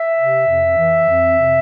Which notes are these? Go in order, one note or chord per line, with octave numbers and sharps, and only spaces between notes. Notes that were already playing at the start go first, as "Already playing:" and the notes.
Already playing: E5
C3
F2
E3
F2
C3